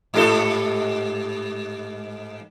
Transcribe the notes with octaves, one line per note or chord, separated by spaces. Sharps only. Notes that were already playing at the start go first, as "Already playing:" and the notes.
G#2 G4 A4